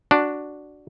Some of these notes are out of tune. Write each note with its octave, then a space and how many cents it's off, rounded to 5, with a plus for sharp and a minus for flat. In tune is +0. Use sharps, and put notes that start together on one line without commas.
D4 +0 F#4 +0